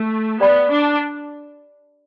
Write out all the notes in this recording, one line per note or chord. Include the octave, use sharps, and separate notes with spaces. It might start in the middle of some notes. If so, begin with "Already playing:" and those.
Already playing: A3
B3 G4 D5 G5 B5
D4